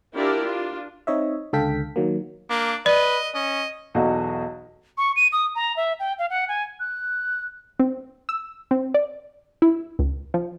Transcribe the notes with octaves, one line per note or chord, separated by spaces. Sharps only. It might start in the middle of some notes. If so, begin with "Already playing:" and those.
D4 E4 F4 G4 A#4 D5
D4 F4
C4 D#4 C#5 D#5 E5
C#2 D3 A4 F5 G5 B6
D#3 F#3 A#3
A#3 D4
B4 D5 D#5
C#4 D#5
B1 E2 F#4 A4 D#5 F5
C#6
D#7
D#6
A#5
E5
G5
F5
F#5
G#5
F#6
C4
E6
C4
D5
E4
C#2
F3